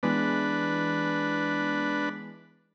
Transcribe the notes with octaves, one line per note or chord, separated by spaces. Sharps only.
E3 G#3 B3 D4 B4